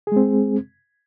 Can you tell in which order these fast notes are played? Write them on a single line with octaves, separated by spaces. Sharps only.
G#4 G#3 C4